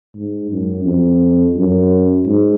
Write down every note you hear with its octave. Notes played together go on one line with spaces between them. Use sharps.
G#2
F#2
F2
F#2
G#2